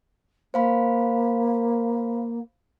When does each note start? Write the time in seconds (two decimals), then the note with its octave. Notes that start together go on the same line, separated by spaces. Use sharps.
0.54 A#3 C5 F5 B5